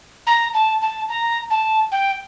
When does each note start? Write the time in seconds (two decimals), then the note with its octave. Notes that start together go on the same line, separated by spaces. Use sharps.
0.27 A#5
0.54 A5
0.81 A5
1.09 A#5
1.50 A5
1.92 G5